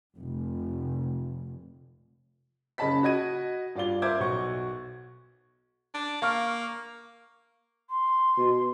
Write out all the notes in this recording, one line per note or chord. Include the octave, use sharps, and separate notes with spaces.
F1
F#1 C#3 D#5 A5 B5 B6
F#4 D#5 G#6 D#7
G2 F4 D5 F5 G7
A#4 C5 E5 D6 G#6
B1 F#4 C#6
D4
A#3 F5 C#6 F6
C6
B2